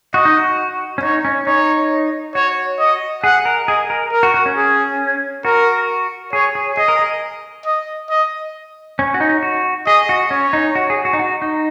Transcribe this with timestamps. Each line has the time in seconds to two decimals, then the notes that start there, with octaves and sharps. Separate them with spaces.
0.14 F#4 D#5
0.25 D#4
0.37 F#4
0.98 C#4
1.03 D#4 C#5
1.25 C#4
1.47 D#4 C#5
2.35 F#4 C#5
2.79 D#5
3.24 G#4 F#5
3.45 A#4
3.68 G#4 D#5
3.90 A#4
4.12 A#4
4.23 F#4
4.34 F#4
4.46 C#4
4.56 G#4
5.45 F#4 A#4
6.33 G#4 C#5
6.55 G#4
6.77 G#4 D#5
6.88 A#4
6.99 G#4
7.66 D#5
8.10 D#5
8.99 C#4
9.14 F#4
9.20 D#4
9.43 F#4
9.87 G#4 D#5
10.09 F#4
10.31 C#4 C#5
10.53 D#4
10.75 F#4
10.90 G#4
11.05 F#4
11.13 D#4
11.19 F#4
11.42 D#4